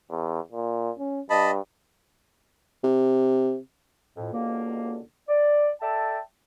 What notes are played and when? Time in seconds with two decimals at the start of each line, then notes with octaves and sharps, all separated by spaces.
0.10 E2
0.52 A#2
0.99 C#4
1.30 G2 D#5 A5 B5
2.84 C3
4.16 F2 A2
4.32 C#2 B2 D3 A#3
5.29 D5
5.81 A4 D5 E5 G5 A5